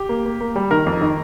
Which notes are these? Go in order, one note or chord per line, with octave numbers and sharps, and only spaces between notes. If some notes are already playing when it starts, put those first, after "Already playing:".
Already playing: G4
A#3
A#3
A#3
G3
D#3 A#4
F2
D#3